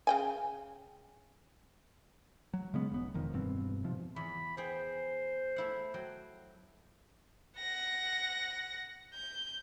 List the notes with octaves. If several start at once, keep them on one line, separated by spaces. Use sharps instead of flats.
C#3 G5 G#5
F#3
C#3 G#3 B3 C#4
E1 B1 B3
E1 F2 D#3
E1 G2 B2 C4
G#2 C3 F3
E2 B5
B3 G#4 C5 G5
A3 E4 F#5
F#3 G5
F#5 A#6
G6